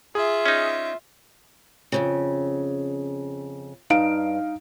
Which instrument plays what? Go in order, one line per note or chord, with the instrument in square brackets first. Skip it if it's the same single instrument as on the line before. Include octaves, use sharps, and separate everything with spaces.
[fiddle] F4 E5 [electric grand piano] G#4
[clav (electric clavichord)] C#4 D#4
[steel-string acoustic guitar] F2 G#2 C#3
[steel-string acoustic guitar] G2 [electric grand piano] D#4 F5 D7